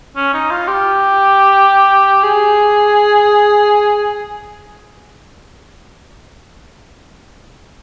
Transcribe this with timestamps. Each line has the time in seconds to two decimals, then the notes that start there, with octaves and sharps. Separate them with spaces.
0.16 C#4
0.34 D#4
0.51 F4
0.68 G4
2.23 G#4